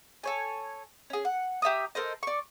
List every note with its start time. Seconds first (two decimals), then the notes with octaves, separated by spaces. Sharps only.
0.24 A4 C#5 G#5
1.10 C#4 G#4
1.25 F#5
1.62 G4 E5 A#5 D#6
1.95 A4 A#4 C5 D#5
2.23 D5 C#6